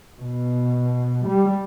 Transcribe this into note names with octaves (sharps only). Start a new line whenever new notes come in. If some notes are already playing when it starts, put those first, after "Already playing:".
B2
G3